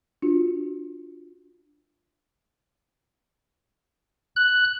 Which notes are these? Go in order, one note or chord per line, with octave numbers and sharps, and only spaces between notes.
D4 F4 F#4
F#6